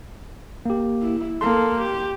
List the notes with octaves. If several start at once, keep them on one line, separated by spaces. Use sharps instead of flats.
A#3 G4
E4
A#3 A4 C6
G4